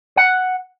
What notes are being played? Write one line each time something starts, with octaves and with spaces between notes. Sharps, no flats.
F#5